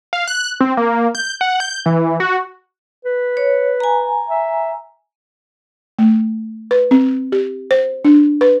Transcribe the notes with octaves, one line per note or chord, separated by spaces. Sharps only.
F5
F#6
C4
A#3
G6
F#5
G6
E3
F#4
B4
C#5
G#5 A#5
E5
A3
B4
C4
G4
C5
D4
B4